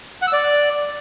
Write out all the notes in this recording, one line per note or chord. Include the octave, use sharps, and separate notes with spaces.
F#5
E6
D5